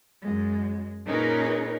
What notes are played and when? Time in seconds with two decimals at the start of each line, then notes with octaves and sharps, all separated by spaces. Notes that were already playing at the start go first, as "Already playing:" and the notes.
0.22 F#2 G#3
1.07 A#2 C#4 D#4 G#4 A#4 B4